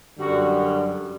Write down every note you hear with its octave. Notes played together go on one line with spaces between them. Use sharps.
F#2 D3 G3 F#4